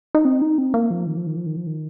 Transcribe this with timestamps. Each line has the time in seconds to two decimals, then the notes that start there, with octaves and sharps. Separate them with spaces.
0.15 D#4
0.25 C4
0.42 D#4
0.58 C4
0.74 A#3
0.91 F3
1.07 D#3
1.17 F3
1.27 D#3
1.36 F3
1.46 D#3
1.57 F3
1.67 D#3